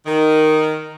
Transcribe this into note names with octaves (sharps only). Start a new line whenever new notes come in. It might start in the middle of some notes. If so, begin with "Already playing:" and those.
D#3